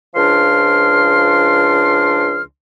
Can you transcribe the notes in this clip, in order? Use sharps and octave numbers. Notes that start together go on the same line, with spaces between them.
C#2 F3 D4 C6 F6